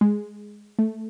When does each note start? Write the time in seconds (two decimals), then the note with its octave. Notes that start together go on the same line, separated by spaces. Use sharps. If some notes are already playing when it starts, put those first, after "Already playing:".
0.01 G#3
0.79 A3